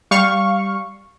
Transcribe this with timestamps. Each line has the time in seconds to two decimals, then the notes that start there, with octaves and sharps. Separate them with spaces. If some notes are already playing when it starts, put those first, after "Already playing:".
0.11 G3 F5 C#6